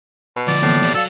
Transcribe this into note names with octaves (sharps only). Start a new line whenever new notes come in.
B2
D3 F3 D5
A2 E3 A#3 B3
F3 G3
F#3 A4 D5 F5